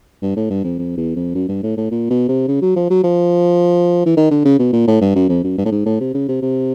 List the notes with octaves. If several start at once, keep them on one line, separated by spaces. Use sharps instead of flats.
G2
A2
G2
F2
F2
E2
F2
F#2
G2
A2
A2
A#2
B2
C3
C#3
F#3
F3
F#3
F3
E3
D#3
D3
C#3
B2
A#2
A2
G2
F#2
F2
F#2
G2
A2
G#2
A2
C3
C#3
C3
C3